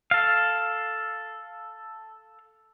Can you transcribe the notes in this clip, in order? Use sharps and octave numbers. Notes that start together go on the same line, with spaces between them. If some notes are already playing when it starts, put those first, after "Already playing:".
A4 F5